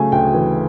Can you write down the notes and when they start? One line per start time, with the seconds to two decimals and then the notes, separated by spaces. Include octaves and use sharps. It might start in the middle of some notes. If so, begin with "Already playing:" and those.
Already playing: C#3 F#3 A3 G#5
0.12 D2 G5
0.34 E3